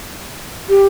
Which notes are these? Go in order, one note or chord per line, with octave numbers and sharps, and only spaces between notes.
G4